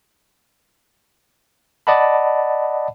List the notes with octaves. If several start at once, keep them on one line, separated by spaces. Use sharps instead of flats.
D5 D#5 F#5 A5 B5